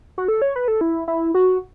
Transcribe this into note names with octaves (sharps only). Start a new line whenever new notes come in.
F#4
A4
C#5
B4
A4
E4
E4
F#4